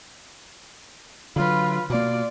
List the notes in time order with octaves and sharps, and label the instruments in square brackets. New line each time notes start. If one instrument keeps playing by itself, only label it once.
[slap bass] D3 F#3 [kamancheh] F4 B4
[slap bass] B2 A#3 [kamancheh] F4 D5